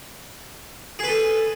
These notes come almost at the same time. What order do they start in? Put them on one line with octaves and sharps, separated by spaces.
G#4 B4 A4